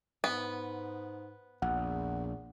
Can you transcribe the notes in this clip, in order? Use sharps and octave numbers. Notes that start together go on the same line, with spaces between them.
G#2 B3
A#1 E2 F#5